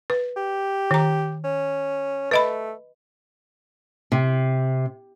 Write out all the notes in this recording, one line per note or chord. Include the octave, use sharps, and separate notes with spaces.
B4
G4
D#3 A#5
C#4
A3 B4 D#5 B5
C3